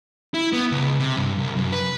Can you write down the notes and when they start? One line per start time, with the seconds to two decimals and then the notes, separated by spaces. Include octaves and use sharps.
0.34 E4
0.53 B3
0.72 C#2
0.99 C3
1.17 G2
1.38 C2
1.56 F#2
1.72 B4